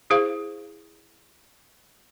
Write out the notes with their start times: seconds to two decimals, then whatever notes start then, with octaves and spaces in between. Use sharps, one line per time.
0.10 E4 G#4 C5 F5